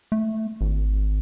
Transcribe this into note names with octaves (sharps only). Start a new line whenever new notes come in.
A3
G#1